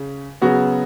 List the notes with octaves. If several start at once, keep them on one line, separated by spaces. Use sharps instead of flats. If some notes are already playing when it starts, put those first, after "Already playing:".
Already playing: C#3
C#3 F#3 B3 F#4